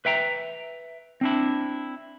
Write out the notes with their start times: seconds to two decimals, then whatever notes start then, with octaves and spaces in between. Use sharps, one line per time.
0.05 B4 E5 G5 A#5
1.21 C4 D4 E4